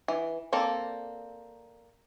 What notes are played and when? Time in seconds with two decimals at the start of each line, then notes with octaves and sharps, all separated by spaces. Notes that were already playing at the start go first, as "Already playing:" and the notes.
0.08 E3
0.53 A#3 C4 A4 D5